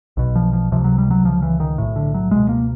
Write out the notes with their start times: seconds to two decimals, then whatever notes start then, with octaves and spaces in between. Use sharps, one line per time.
0.17 B1 B2
0.36 F3
0.53 F3
0.72 C#2 C3 F3
0.84 F#3
0.98 G3
1.11 F#3
1.24 C#2 C#3 F3
1.42 E3
1.60 D#3
1.78 B1 A2
1.96 D3
2.14 F#3
2.31 C#2 B2 G#3
2.49 A#3